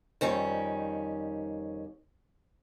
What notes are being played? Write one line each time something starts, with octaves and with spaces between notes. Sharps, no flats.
F2 D#3 G3 C#4